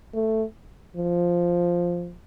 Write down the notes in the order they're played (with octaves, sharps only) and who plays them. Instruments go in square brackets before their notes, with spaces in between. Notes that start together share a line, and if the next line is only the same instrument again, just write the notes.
[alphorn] A3
F3